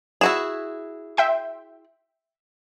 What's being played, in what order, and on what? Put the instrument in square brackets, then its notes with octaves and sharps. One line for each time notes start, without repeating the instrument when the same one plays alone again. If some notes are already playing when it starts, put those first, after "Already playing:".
[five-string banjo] E4 F#4 G#4 [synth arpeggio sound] E7
[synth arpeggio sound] E5 G5 C6